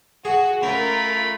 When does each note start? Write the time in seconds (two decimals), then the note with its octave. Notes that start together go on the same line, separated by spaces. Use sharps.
0.25 F#4 G#4
0.63 A3 C#4 F4 A#4 B5